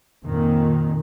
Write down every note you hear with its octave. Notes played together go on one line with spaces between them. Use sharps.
F2 A#2 D#3